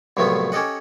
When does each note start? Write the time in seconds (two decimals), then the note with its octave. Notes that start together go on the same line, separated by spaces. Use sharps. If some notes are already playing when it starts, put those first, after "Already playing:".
0.17 C2 A2 F3 F#3 A3 B3
0.52 C#4 G4 A4 D#5 F#5